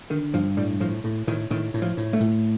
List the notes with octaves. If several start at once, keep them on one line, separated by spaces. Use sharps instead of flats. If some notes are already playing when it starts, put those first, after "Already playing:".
D3 D#3
G2 F3
A2 G3
A2 F3
A2
A2 D#3
A2 D#3
A2
F3
A2
A3
A2